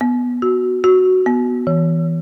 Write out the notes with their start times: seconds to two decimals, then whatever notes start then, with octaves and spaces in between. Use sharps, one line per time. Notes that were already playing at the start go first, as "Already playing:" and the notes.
0.01 B3
0.42 F#4
0.84 F#4
1.26 B3
1.67 E3